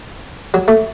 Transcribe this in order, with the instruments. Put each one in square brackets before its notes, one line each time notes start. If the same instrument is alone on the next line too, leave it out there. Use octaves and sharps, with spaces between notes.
[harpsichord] F#3
A3